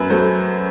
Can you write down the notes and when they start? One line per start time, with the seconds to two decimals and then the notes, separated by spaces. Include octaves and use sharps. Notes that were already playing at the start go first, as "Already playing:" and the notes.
Already playing: F#2 B4
0.10 F#3 A3 C5